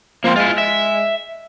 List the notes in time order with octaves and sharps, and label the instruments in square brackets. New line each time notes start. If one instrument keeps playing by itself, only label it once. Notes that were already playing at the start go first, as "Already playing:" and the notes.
[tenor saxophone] F3 [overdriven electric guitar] A#3 C4
[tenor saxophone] G#3 [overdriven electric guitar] E4 F4
[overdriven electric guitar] E5